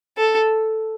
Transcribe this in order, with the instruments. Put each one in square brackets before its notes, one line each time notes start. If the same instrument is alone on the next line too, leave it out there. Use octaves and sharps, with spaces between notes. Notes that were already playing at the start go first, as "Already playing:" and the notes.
[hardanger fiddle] A4